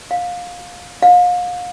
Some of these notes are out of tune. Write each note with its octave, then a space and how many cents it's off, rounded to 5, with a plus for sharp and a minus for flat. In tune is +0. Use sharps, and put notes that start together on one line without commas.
F5 +20
F5 +35